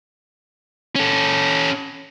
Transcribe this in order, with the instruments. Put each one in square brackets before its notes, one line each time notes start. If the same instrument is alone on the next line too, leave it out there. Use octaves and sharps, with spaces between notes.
[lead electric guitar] C#4 A4